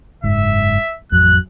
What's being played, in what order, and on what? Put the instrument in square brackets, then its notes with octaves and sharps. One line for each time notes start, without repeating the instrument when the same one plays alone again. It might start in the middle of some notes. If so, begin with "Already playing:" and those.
[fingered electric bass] F#1 G#2 [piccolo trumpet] E5
[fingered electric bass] A1 F2 F#3 [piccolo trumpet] F#6